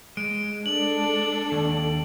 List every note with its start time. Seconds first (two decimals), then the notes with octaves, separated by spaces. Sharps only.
0.17 G#3 D7
0.66 D4 A4 F#7
1.52 D#2